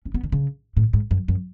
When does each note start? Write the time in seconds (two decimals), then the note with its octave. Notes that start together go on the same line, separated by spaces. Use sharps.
0.05 C#4
0.14 B3
0.23 D3
0.32 C#3
0.77 A2
0.93 G#2
1.11 F#2
1.28 F#2